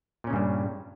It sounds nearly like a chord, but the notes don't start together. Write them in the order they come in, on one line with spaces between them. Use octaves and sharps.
A#2 C#4 C#3 G2 G3